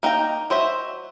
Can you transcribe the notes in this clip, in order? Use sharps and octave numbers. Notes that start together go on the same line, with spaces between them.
A#3 D#4 G5 A#5
F#3 C5 D#5 E5